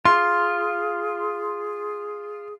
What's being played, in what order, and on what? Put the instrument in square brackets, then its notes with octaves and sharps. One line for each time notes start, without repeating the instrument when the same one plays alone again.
[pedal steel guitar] F4 [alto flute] G#4 [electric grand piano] C6